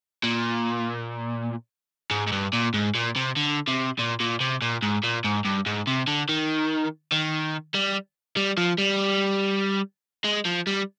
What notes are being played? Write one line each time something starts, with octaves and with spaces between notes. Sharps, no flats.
A#2
G#2
G#2
G2
A#2
G#2
A#2
C3
D3
C3
A#2
A#2
C3
A#2
G#2
A#2
G#2
G2
G#2
C3
D3
D#3
D#3
G3
G3
F3
G3
G#3
F3
G3